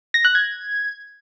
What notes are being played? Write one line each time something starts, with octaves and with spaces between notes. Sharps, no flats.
A#6
F#6
G#6